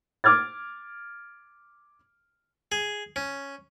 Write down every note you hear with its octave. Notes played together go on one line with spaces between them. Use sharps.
D6 F6 G#6 A6
G#4
C#4